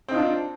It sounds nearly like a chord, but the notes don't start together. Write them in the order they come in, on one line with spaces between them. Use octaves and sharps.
C4 D#4 F4 D4